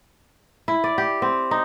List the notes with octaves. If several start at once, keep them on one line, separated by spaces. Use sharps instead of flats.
E4
D5
G4
C4
D#4